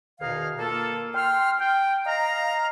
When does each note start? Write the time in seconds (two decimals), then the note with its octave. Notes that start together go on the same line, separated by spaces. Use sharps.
0.20 E2 B2 D#3 D#4 G#4 F5
0.59 A#3 F4 A4
1.15 G5 C6 F6
1.59 G5
2.06 D#5 F5 A#5